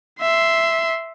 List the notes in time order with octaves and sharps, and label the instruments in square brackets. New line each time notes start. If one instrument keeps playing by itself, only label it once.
[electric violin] E5 C6